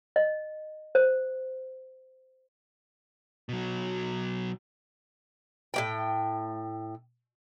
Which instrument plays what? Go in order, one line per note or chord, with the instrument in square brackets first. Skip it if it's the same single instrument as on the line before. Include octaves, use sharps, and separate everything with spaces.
[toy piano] D#5
C5
[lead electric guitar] B2 F#3
[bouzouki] A2 A#3 G5